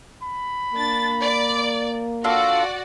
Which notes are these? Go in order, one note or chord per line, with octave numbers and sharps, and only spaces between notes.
B5
A#3 D4 A6
D5
D4 F4 F#4 A4 D5 F#5